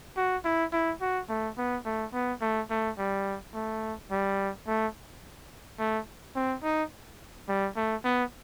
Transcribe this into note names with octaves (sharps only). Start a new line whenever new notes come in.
F#4
E4
E4
F#4
A3
B3
A3
B3
A3
A3
G3
A3
G3
A3
A3
C4
D#4
G3
A3
B3